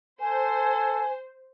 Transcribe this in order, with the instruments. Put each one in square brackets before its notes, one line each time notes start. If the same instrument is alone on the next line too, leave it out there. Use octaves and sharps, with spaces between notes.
[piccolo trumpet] A4 [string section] C5 [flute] G#5